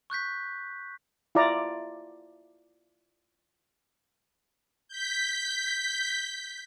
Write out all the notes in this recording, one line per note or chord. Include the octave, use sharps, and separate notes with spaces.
C#6 F#6 G6 B6
E4 F4 D5 A#5
G6 B6